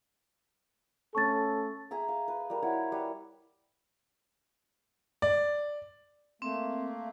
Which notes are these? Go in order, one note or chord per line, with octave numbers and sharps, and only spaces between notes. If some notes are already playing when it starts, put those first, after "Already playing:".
A3 C#4 A4 C#6 A6
G#4 E5 A#5
F5
B4
G3 A#4
E4 F#4 C#5 D5
G3 B4 C#6
D5
A3 A#3 C4